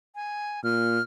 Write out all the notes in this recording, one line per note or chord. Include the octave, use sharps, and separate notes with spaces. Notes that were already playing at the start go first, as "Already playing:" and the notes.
G#5
A#2 F6